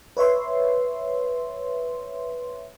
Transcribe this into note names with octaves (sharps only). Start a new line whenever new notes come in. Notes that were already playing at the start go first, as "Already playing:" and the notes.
B4 C#5 E5 C6